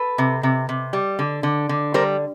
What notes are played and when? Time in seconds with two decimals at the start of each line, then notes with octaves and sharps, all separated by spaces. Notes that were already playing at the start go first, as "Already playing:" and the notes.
Already playing: A4 B4
0.18 C3
0.43 C3
0.69 C3
0.93 G3
1.19 D3
1.43 D3
1.69 D3
1.94 G3 A#4 C5